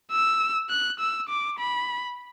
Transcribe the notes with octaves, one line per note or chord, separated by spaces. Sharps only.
E6
F#6
E6
D6
B5